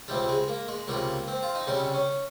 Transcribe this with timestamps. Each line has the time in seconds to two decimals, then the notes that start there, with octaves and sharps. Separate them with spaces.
0.08 C#2 C3 G3 C4
0.28 G#3
0.48 A#3
0.68 G#3
0.88 C#2 C3 G3 A#3
1.28 C4
1.42 F4
1.55 D#4
1.67 C#2 C3 G3 C#4
1.94 C#4